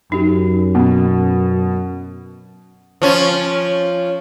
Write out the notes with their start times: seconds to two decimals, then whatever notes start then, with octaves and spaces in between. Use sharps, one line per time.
0.12 F#2 D#4 G4
0.75 B2 B3 C#4
3.02 F3 C#4